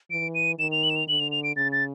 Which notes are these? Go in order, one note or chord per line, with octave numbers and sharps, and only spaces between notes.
E3 D7
D#7
D#3 E7
F7
F#7
E7
F7
D3 F#7
F7
F7
D7
C#3 A6
A6